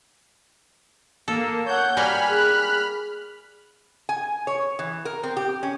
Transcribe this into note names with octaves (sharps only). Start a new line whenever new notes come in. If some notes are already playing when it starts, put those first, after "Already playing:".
A#3 A4
C#5 F#5 G6
G3 A#3 F#4 G#5 B5 F6
G#4 F#6
G#5
C#5
E3
A#4
C4
G4
C#4